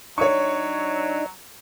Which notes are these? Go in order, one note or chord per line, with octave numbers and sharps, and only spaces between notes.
F#3 D4 D#4 C#5 C#6